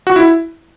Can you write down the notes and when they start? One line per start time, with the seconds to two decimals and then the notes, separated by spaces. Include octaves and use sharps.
0.07 F#4
0.16 E4